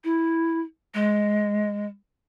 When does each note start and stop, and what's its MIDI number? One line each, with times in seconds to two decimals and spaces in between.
0.04 0.60 64
0.94 1.86 56